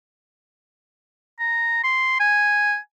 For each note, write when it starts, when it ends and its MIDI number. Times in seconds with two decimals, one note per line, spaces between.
1.39 1.84 82
1.84 2.18 84
2.20 2.77 80